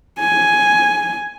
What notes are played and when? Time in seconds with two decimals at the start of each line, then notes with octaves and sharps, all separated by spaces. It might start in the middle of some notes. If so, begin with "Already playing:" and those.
0.20 G#5